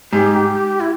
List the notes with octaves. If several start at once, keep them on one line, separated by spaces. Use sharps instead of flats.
G#2 G4
E4